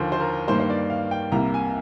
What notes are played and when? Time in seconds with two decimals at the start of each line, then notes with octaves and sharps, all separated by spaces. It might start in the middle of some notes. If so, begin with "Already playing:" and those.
Already playing: D#2 D3 F3 A#4 C5
0.12 C5
0.20 A#4
0.48 G2 D#3 A#3 C5
0.60 C5
0.70 D5
0.90 F5
1.11 G5
1.32 C2 C3 G3 A#3 A#5
1.54 G#5